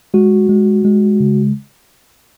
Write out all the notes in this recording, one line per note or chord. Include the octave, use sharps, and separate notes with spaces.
G#3 F#4
G#3
G#3
C#3